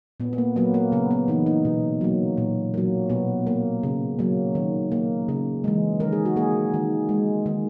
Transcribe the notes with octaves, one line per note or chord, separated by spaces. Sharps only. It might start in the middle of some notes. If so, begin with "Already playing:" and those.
A#2 B3
B3
A#3
F#3 A#3 B3
A#3
C#3 B3
B3
E3 A#3 D#4
D#4
B2
F#3 A#3
A#2
F#3 A#3
B2 B3
A#3
C#3
F#3 A#3
D#3
A#3
C#3
E3 G#3
D#3 A#4
G#4
F#4
A#3 G#4
D#3
G#3
D#3